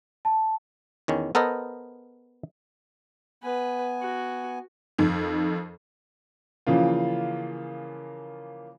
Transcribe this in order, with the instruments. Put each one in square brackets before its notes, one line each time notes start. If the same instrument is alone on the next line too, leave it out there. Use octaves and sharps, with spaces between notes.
[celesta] A5
[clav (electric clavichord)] E2 D#3 C#4
B3 A4 A#4 C5 D#5
[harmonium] B3 G#5 [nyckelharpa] B4
[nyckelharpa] F#4
[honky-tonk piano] F2 D#3
[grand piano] C#3 E3 F3 A#3 F4